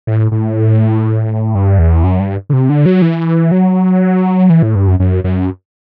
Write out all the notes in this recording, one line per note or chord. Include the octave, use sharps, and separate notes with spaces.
A2
A2
G2
E2
F#2
G2
D3
C3
D3
F#3
E3
F#3
E3
A2
G2
F#2
F#2
F#2